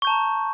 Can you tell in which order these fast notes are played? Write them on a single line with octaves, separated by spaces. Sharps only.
C#6 G6 A5 A#5